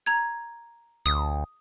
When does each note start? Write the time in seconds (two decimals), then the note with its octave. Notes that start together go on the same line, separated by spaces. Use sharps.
0.06 A#5 G#6
1.06 D2 D#6